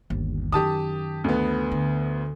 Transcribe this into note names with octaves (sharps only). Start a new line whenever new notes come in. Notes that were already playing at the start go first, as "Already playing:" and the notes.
G1 D#2
F#2 D#3 G4 A5 D#6
D2 B3
D3